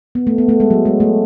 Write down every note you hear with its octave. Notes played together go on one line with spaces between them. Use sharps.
B3
A3
B3
A3
G#3
F#3
G#3
A3